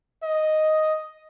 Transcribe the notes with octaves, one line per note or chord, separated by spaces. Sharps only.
D#5